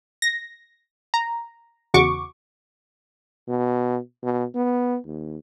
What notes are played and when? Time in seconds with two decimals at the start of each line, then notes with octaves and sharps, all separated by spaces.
0.22 A#6
1.14 A#5
1.94 E2 C#3 F#4 C#6 D6
3.48 B2
4.23 B2
4.55 B3
5.06 D#2